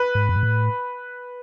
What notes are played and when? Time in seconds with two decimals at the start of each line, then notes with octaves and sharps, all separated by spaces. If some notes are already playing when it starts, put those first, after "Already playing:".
Already playing: B4
0.15 G#2
0.29 F#2
0.36 G#2
0.43 A2